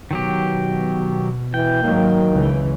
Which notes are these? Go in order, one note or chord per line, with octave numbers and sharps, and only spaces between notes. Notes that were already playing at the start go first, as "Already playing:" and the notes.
B2 D#3 F#3 G4
E3 G5
G#2 D#3 F#3 A#3
C#2 C#3 E3